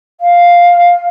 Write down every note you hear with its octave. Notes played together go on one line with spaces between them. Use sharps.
F5